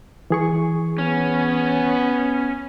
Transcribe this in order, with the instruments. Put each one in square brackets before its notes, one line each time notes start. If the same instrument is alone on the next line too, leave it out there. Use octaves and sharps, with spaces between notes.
[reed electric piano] E3 G#4 C#6
[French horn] B3 [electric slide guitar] C#4